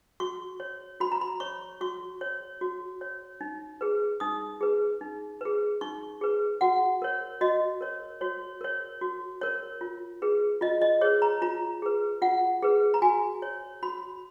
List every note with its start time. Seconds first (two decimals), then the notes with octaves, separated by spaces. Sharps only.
0.20 F#4 C#6
0.60 C#5
1.00 F#4 B5
1.12 A#5
1.21 B5
1.40 C#5 C#6
1.81 F#4 C#6
2.21 C#5
2.61 F#4
3.01 C#5
3.41 D#4
3.81 G#4 B4
4.20 D#4 D#6
4.61 G#4 B4
5.01 D#4
5.41 G#4 B4
5.81 D#4 C#6
6.21 G#4 B4
6.61 F#4 F#5
7.02 A#4 C#5
7.41 F#4 D#5
7.81 A#4 C#5
8.21 F#4 C#5
8.61 A#4 C#5
9.01 F#4
9.41 A#4 C#5
9.81 F4
10.22 G#4 B4
10.61 F4 D#5
10.82 D#5
11.01 G#4 B4 C#5
11.22 A#5
11.42 F4 A#5
11.82 G#4 B4
12.22 F4 F#5
12.63 G#4 B4
12.94 A#5
13.02 F#4 G#5
13.42 C#5
13.83 F#4 B5